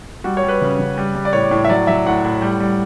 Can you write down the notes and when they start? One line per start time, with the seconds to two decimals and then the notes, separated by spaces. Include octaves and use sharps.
0.24 G3 F#4
0.37 C#5
0.43 G3
0.48 B4
0.62 C#3
0.79 C#3
0.98 G3
1.15 G3
1.25 D5
1.33 A2 C#5
1.51 A2
1.65 E5
1.69 F#3 D5
1.87 F#3 E5
2.06 A2 F#5
2.24 A2
2.42 G3
2.60 G3